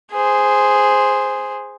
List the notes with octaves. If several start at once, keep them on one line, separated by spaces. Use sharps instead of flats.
G#4 C5